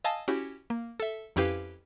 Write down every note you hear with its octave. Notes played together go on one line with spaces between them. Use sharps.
D#5 F5 G#5 A5 D#6 E6
C#4 E4 F#4 G4
A#3
A4 E5
F2 C#4 E4 G4 B4 F5